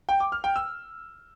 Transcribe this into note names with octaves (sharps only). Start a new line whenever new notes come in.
G5
D6
F6
G5
E6